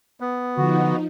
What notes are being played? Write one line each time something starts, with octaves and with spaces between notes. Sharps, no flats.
B3
D3 F3 D#4 F#4